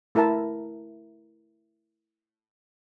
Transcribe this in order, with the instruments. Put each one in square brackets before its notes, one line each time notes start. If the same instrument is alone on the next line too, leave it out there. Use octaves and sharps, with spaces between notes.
[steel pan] A3 E4 A#4 E5 A5